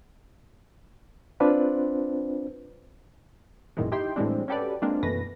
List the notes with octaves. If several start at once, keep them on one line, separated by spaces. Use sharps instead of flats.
C4 D4 F4 B4 C5
A1 F#2 A#2 D#3 E3 G#3
D#4 E4 G4 G5 C6
A2 E3 G3 G#3 C4 D4
C#4 F#4 G4 A4 B4 D5
G#3 A#3 C4 D4 F4
F#2 B2 E3 A3 B4 A#6